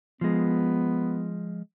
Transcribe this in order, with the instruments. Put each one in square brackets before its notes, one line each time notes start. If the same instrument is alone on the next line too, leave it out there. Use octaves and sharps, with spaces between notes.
[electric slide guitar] F3 G#3 [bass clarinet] B3